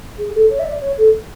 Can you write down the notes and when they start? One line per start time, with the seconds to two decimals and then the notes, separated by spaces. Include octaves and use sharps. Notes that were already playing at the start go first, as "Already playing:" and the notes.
0.18 G#4
0.34 A4
0.49 C#5
0.59 E5
0.65 D5
0.81 C#5
0.97 A4